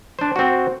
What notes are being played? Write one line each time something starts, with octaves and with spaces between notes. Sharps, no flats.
D4 C5
C4 F#4